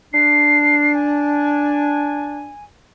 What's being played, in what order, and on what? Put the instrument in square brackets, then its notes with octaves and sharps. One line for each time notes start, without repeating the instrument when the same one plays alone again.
[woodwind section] D4 [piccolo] C7
[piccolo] G#5